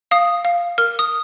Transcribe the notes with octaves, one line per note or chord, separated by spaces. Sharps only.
F5 D#6
F5
A#4 F6
D#6